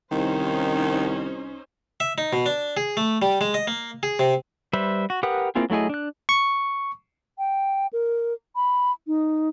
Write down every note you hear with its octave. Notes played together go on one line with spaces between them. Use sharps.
C2 D#3 C#4 D#4 C5
E5
D#4
B2
D4
G#4
A3
G3
G#3
D#5
A#3
G#4
C3
G3 B4 C5 E5
F#4
G4 A#4 B4 F#5 D#6
A#3 C4 E4 F4 G#4
F#3 A3 E4 G#4 D#5
D4 F#6
C#6
G5
A#4
B5
D#4